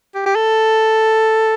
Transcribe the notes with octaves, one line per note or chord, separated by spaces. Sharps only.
G4
G4
A4